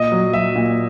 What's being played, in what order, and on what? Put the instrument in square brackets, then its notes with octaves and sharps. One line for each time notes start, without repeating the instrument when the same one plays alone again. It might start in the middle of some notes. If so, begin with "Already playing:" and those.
Already playing: [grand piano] A#2 D#5
F#3
F#3 E5
A#2